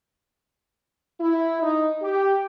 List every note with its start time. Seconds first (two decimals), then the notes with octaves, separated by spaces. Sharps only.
1.20 E4
1.62 D#4
2.03 G4